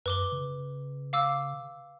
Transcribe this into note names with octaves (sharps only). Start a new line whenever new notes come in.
F#2 B4 D6 G7
C#3
F5 D6 E6